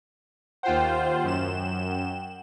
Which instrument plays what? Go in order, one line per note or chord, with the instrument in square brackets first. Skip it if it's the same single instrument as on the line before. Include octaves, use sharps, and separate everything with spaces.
[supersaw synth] D#2 F4 C5 [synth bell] F#5 G5
[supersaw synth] F#2 E7